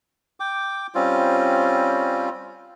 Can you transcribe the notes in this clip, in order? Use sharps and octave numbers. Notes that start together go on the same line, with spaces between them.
G5 D6
G3 C4 C#4 F4